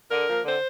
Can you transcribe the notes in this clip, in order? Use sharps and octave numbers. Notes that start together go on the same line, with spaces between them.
D3 A#4
F3 A#3
D3 C5